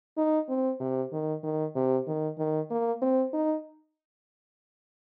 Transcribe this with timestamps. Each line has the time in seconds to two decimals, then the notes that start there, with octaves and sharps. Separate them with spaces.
0.17 D#4
0.49 C4
0.80 C3
1.12 D#3
1.43 D#3
1.75 C3
2.07 D#3
2.38 D#3
2.70 A#3
3.02 C4
3.33 D#4